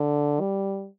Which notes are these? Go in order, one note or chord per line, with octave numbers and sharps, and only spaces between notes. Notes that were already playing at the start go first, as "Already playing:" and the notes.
Already playing: D3
G3